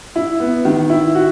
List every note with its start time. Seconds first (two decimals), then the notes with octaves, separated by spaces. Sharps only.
0.16 E4
0.40 B3
0.65 D#3
0.90 E4
1.15 F#4